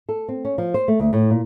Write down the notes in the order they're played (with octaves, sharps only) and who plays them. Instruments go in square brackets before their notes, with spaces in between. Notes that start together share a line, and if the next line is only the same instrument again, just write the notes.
[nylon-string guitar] A4
C4
C#4
F3
C5
A3
D2
A2
A#2